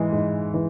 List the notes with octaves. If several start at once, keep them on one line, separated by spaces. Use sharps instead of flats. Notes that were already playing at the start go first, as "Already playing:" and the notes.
Already playing: G#2 E3 G#3
G#2
E3